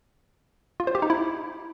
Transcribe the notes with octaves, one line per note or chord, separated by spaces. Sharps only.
F4
C5
G4
D#4
E4